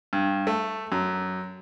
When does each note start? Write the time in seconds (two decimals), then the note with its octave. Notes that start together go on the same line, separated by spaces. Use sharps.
0.13 G2
0.47 A3
0.92 F#2